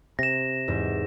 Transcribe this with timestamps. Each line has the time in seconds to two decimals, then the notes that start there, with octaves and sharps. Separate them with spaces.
0.19 C3 A#6 E7
0.68 E2 G#2